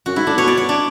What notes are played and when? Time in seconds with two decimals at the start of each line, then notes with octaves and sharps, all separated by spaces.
0.06 F#2 F#4
0.16 G#2 E4
0.27 A2 D4
0.37 B2 C#5
0.47 D5
0.57 C#5
0.69 D4